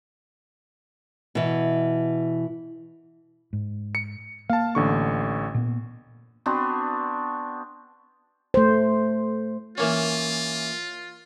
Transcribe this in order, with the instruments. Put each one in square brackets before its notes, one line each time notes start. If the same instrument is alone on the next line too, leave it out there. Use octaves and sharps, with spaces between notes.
[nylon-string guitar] B2 E3
[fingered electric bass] G#2
[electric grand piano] C#7
[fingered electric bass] A#3 [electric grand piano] F5 A5
[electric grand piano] A1 D3 C#6
[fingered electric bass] A#2 A#3 B3
[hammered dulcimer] B3 C4 D4 F#4
[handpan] A3 C5
[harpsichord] E3 A#3 C#4 [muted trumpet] F4